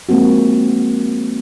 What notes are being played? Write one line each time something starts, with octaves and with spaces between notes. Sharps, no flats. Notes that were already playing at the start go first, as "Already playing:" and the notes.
F3 G#3 A#3 C4 F#4